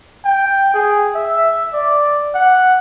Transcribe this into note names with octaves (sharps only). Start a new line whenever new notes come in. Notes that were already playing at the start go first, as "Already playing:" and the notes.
G5
G#4
E5
D5
F#5